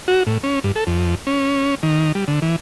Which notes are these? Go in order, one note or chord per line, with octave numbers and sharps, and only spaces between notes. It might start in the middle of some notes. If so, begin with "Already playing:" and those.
F#4
A2
C#4
G2
A4
F2
C#4
D#3
G3
D3
E3